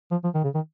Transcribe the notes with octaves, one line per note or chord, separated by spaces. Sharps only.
F3
F3
D#3
C#3
D#3